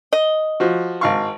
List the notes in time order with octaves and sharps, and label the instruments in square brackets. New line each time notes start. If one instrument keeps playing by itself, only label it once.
[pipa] D#5
[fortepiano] F3 F#4
G#1 F5 C#6